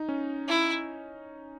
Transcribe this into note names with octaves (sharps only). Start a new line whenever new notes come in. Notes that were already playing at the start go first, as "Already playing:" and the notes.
Already playing: D#4
C#4
E4